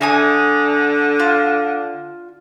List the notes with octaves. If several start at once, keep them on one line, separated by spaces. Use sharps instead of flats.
D3 E5 G#5 D#6
F4